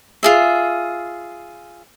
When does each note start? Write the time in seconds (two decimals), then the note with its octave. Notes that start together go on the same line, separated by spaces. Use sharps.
0.23 F4 G#4 E5